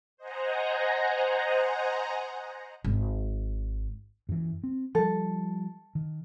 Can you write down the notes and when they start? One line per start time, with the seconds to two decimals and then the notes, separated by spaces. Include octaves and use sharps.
0.17 C5 D#5 F#5 G#5 A#5
2.84 G#1
4.29 F#2 E3
4.64 C4
4.95 F3 G3 A4
5.95 D#3